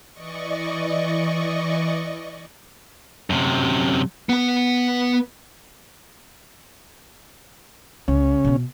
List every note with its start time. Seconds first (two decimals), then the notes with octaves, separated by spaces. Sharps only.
0.12 E3 D5 D#5 C#6
3.30 F#2 C3
4.29 B3 B4
8.08 C#2 C#3 C#4
8.44 B2 B3